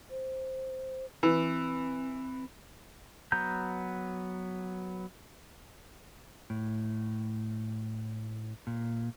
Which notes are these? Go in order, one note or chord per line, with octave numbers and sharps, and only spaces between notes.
C5
E3 C4
F#3 B3 A#5 G6
A2
A#2